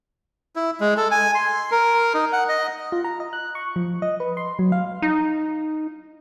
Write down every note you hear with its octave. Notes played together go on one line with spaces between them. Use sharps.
E4
G#3
A4
G#5
C6
A#4
D#4
F#5
D#5
F4
A#5
D#5
F#6
C#6
F3
D#5
B4
C6
F#3
F5
D#4